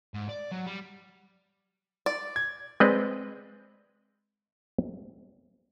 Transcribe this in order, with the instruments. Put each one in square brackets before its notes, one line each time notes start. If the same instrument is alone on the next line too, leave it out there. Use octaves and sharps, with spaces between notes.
[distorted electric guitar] G#2
D5
F#3
G3
[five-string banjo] D5
[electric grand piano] G#6
[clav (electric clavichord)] G#3 C4 B4 D5 D#5